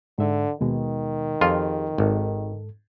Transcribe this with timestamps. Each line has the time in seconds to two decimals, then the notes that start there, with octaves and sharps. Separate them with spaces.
0.19 G#2 D3 E5
0.61 D#2 B2 D#3 G#3
1.41 F2 F4 G4 G#4
1.98 G#1 G#2 A4